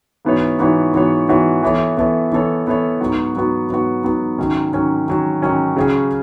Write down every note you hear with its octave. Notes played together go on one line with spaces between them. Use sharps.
G#2 E3 B3 F#4 C#5
G#2 E3 B3 F#4 C#5
G#2 E3 B3 F#4 C#5
G#2 E3 B3 F#4 C#5
E3 B3 E4 A4 C#5
E3 B3 E4 A4 C#5
E3 B3 E4 A4 C#5
E3 B3 E4 A4 C#5
G#2 F#3 B3 F#4
G#2 F#3 B3 F#4
G#2 F#3 B3 F#4
G#2 F#3 B3 F#4
G#2 D#3 F#3 C#4
G#2 D#3 F#3 C#4
G#2 D#3 F#3 C#4
G#2 D#3 F#3 C#4
C#3 F#3 C#4 G#4